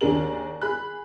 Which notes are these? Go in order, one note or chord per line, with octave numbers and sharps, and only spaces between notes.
D#2 D4 G#4 A#4 F#7
G#4 B5 F#6